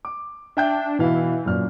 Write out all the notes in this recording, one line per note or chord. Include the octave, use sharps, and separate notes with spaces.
D6
D4 E5 G5 G6
B2 E3 E4 F5
F#2 A#2 F6